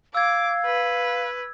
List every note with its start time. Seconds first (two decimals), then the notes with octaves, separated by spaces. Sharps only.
0.15 F5 D6 E6 G#6
0.66 B4